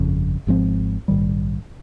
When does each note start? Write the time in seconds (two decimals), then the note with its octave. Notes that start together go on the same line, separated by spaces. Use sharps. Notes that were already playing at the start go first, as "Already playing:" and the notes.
Already playing: G1 F2 C#3
0.47 G#1 G#2 F3 C4
1.08 A#1 G#2 D#3 G3